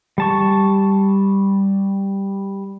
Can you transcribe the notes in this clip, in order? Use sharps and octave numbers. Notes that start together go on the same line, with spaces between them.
G3 A5 C#6